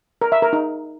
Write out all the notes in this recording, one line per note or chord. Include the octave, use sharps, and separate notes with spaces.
A#4
E5
A#4
D#4